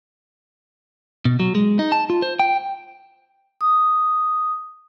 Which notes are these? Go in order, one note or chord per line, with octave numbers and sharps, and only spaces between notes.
B2
F#3
G#3
D#4
A5
F4
C5
G5
D#6